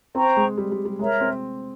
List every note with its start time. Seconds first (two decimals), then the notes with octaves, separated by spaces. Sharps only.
0.15 C4 C5 G5 A#5 C#6
0.37 G#3
0.58 G3
0.72 G3
0.85 G3
0.99 G#3 A#4 C#5 E5 A#5
1.21 C4